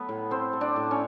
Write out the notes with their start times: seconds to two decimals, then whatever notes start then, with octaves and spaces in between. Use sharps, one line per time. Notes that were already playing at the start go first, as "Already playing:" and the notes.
Already playing: F#3 A3 B3 B4
0.09 A2
0.31 A3 C4 C5
0.53 A3
0.61 D4 D5
0.76 A2
0.91 C#4 C#5